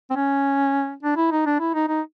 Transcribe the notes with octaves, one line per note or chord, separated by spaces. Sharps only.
C4
C#4
D4
E4
D#4
D4
E4
D#4
D#4